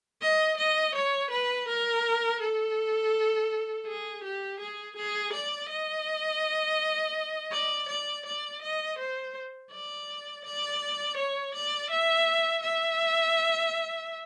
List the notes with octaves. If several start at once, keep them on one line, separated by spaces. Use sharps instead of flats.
D#5
D#5
C#5
B4
A#4
A4
G#4
G4
G#4
G#4
D5
D#5
D5
D5
D5
D#5
C5
D5
D5
C#5
D5
E5
E5